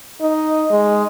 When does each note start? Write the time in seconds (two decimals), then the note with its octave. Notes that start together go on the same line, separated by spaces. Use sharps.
0.21 D#4
0.71 G#3